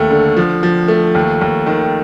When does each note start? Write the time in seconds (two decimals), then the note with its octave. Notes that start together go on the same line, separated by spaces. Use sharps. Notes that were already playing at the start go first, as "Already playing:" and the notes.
Already playing: D#2 A3
0.11 D3
0.37 F3
0.63 F3
0.88 A3
1.15 D#2
1.41 D#2
1.66 D#3